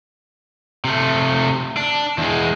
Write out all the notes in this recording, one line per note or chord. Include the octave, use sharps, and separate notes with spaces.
C3 A3
D4
E2 G#3